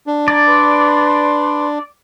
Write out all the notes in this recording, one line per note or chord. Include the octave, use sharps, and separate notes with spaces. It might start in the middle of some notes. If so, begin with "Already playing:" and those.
D4
D5 A#5 G#6
B4 B5 C6